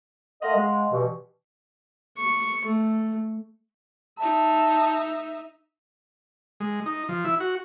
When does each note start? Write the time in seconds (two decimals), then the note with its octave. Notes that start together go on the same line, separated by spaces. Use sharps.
0.42 A3 A#4 D#5 F5 F#5 C6
0.56 G#3
0.92 G2 B2 E3
2.17 C#6
2.65 A3
4.18 D#4 E5 A5
6.60 G#3
6.86 D#4
7.09 F3
7.25 E4
7.40 F#4